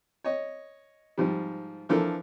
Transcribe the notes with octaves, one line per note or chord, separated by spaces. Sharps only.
C#5 D#5
G#2 F3 G3
E3 F3 D4 A4 A#4